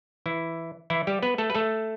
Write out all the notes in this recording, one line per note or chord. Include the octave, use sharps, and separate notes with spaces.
E3 E4
E3 E4
G3 G4
B3 B4
A3 A4
B4
A3 A4